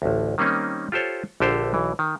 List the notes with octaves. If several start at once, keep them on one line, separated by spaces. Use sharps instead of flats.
A1 D2
D#3 G3 A#3 C4 C#4 D#4
F4 G4 A4 C5 C#5
A#1 D3 G4 A4 C5 F5
B1 E3
D#3